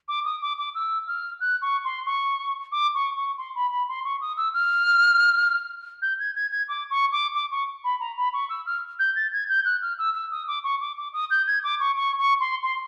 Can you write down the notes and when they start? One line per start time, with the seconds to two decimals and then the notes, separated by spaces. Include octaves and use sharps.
0.08 D6
0.25 D#6
0.41 D6
0.58 D6
0.75 E6
1.07 F6
1.40 F#6
1.62 C#6
1.85 C6
2.06 C#6
2.72 D6
2.94 C#6
3.16 C#6
3.38 C6
3.55 B5
3.71 B5
3.88 C6
4.05 C#6
4.21 D#6
4.37 E6
4.54 F6
6.02 G6
6.19 G#6
6.35 G#6
6.51 G#6
6.68 D6
6.90 C#6
7.12 D6
7.34 D6
7.51 C#6
7.84 B5
8.00 A#5
8.17 B5
8.33 C#6
8.49 E6
8.66 F6
8.99 G6
9.16 A6
9.32 G#6
9.49 G6
9.65 F#6
9.82 F6
9.98 E6
10.15 E6
10.31 D#6
10.47 D6
10.64 C#6
10.81 D6
10.97 D6
11.13 D#6
11.30 G6
11.47 G#6
11.63 D6
11.80 C#6
11.96 C#6
12.18 C#6
12.40 C6
12.63 C6